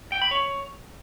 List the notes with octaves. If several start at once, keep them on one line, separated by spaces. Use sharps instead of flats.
G5
B5
C#5